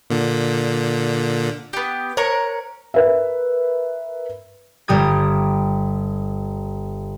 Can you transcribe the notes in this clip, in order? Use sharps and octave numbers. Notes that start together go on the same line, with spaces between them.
A#2 D3
B3 G4
A#4 C5 C#5
A#4 B4 E5
G1 G3 G4 D#6 G#6